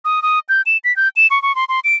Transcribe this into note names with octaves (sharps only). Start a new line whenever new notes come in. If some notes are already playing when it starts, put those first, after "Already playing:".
D#6
D#6
G6
E7
B6
G6
E7
C#6
C#6
C6
C6
D7